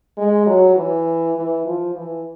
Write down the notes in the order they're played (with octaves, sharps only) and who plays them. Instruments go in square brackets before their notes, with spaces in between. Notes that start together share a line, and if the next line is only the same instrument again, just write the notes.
[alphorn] G#3
F#3
E3
E3
F3
E3